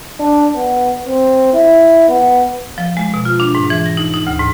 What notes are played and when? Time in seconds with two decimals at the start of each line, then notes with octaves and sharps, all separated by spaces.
0.20 D4
0.55 B3
1.06 C4
1.54 E4
2.09 B3
2.78 F3
2.97 G#3
3.14 B2
3.25 F4
3.40 D4
3.55 G#2
3.70 E3
3.86 A#6
3.97 D#4
4.14 D#4
4.27 D2
4.39 G#2